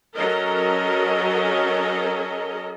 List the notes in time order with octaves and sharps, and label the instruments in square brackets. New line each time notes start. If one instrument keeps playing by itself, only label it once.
[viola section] F#3 C#4 A4 A#4 D#5